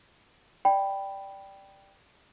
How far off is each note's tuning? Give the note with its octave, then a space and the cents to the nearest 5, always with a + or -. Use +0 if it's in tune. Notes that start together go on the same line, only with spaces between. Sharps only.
D5 +0 G5 +0 B5 +0